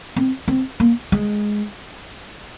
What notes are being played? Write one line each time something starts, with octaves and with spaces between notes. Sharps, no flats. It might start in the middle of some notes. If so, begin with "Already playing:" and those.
C4
C4
A#3
G#3